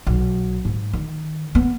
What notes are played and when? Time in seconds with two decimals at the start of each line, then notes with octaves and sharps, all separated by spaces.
0.07 B1
0.65 G#2
0.93 D#3
1.55 B3